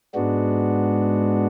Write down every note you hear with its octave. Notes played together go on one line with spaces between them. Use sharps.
G#2 G#3 B3 D4 F#4